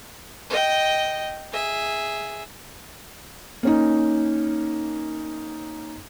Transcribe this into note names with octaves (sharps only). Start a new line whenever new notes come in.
D#5 G5
G#4 E5
A#3 C#4 D#4